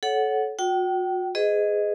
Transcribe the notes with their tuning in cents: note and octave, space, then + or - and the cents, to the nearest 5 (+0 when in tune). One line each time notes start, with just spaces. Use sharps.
A4 -25 C#5 +0 F#5 +0
F#4 -40 G5 -35
G#4 +0 B4 +45 D#5 +0